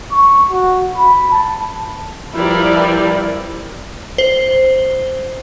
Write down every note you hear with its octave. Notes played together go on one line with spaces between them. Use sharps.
C#6
F#4
B5
A5
F3 G3 E4 A#4 B4 D5
C5